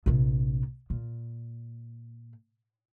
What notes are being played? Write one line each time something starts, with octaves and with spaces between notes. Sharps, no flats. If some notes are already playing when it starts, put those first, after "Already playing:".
A#1 C3
A#2